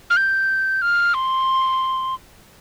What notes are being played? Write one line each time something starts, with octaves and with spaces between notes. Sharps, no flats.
F6
G6
F6
C6